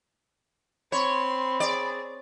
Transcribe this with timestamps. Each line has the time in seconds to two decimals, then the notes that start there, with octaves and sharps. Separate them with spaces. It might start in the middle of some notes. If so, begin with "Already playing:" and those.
0.92 C4 C#5 B5 C6
1.60 G#4 D5